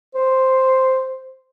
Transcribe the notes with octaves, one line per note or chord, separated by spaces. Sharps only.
C5